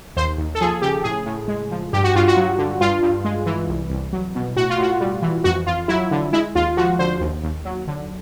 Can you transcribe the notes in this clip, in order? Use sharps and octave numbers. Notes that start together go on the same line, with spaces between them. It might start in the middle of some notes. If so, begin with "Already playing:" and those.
D#2 C5
D#2
A4
F3 G#4
C#3 G4
A2 G#4
A2
G#3
F3
G2 G4
F#4
G2 F4
F#4
F#3
D3
G2 F4
G2
G#3
E3
C2
C2
F#3
B2
A2 F#4
F4
A2 F#4
G3
E3
F2 F#4
F2 F4
F#3 E4
D3
G#3 E4
D#2 F4
F3 F#4
D3 C5
D#2
D#2
F#3
D3